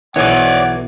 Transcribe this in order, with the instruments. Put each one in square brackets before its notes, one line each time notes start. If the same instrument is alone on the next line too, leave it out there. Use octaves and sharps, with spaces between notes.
[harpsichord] B1 G#5 [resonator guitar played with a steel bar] E3 [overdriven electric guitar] C#5 D5 [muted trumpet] F#5